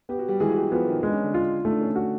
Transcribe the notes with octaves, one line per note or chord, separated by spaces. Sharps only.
B3 G4
F#4
G3 G4
E3 G#3 G#4
F#4
G3 G4
F3 B3 F4
D#3 D#4
G#3 D4
C#4
D3 D4
F4
A3 D#4
D4
C#4
D3 D4
F#4